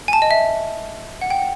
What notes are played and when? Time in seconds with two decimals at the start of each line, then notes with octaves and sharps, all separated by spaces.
0.08 G#5
0.13 A5
0.22 D#5
0.31 E5
1.21 F#5
1.30 G5
1.39 F#5